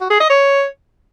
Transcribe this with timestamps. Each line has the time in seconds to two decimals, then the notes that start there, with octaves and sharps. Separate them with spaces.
0.01 F#4
0.10 G#4
0.20 D#5
0.30 C#5